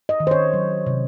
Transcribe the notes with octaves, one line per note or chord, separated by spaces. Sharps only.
D#5
D#3
C5
C#5
F#3
C3